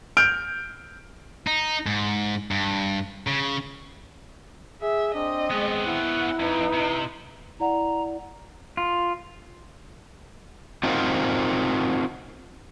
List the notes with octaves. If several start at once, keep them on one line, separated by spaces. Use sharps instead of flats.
F6 G6 D7
D#4
G#2
G2
C#3
G#4 E5
C4 D4 D#5
G#3 B3 C#4
E4 F#5
F2 D#4 B4
C3
E4 D5 F#5 A#5
F4
C4 D#4 F4 F#4 A#4 C5